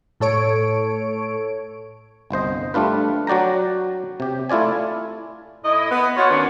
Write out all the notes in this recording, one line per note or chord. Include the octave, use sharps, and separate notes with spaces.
A2 A4 C#5 D7
G1 C2 C5 D#5
G3 A3 D4 F4 B4
F#3 F#4 D5 G5 A#5
C3 G4
A3 E4 F4 D5 G#5
A2 E4 D#5
B3
F4 F#4 C#5
D#2 D#3 A#3 C#4 D4